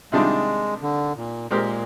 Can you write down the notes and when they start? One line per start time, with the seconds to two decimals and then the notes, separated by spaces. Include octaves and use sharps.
0.12 C3 D#3 G3 G#3 D4 F4
0.82 D3
1.16 A#2
1.51 A#2 G#3 C4 G4 A#4